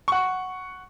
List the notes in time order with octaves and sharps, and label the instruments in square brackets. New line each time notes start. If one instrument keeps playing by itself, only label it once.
[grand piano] F#5 C#6